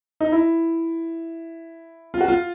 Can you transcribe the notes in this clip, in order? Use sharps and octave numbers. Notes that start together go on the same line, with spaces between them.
D#4
E4
F4
F#4
F4